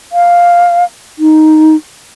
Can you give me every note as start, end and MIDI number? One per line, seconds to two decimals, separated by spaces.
0.13 0.85 77
1.19 1.76 63